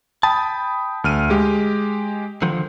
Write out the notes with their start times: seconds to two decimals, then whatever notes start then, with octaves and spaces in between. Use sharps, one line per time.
0.23 G5 A5 B5 D#6
1.04 D2 F6 D#7
1.30 G#3 G4
2.42 D3 D#3 F3